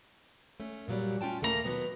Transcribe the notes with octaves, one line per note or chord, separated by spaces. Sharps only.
A3 C#4
G2 A#2 D3 F#3 G3
A3 C#4 F4 G5 A5
D#2 A#2 A3 A#3 F#4 A#5
B2 D#3 F#3 B3